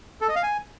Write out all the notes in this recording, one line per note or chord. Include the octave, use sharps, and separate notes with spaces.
A4
D#5
F5
G#5